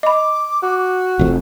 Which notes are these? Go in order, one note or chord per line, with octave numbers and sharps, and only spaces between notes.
D#5 B5 D6
F#4
F1 F2